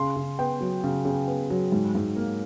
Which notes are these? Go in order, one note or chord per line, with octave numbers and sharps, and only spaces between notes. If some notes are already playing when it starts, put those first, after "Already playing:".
Already playing: C#3 C6
C#3
B3 G5
F#3
C#3
C#3
B3
F#3
G#2
G#2
A#3